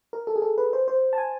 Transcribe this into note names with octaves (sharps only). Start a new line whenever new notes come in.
A#4
A4
G#4
A4
B4
C5
C5
A5
G#5